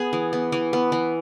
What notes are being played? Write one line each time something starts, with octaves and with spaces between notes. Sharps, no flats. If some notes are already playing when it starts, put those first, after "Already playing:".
Already playing: B3 G#4
E3
B3
E3
B3
E3